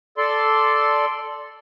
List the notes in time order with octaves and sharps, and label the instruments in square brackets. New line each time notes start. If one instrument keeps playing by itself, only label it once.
[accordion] A4 D5 C6